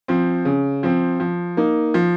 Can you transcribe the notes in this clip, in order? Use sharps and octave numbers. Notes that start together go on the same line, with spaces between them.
F3 C4
C#3
F3 C4
F3
A#3 D#4
F3